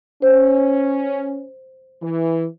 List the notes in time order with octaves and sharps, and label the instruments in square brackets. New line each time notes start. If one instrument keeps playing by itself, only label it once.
[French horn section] C#4 [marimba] C5
[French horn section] E3